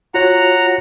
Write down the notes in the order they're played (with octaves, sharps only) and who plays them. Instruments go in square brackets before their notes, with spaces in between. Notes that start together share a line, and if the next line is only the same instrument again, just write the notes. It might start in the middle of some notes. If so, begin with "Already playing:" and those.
[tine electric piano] F4 F#4 C#5 [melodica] F#5 A#5